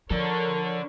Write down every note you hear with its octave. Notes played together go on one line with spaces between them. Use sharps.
F3 D4 A4 A#4 C#5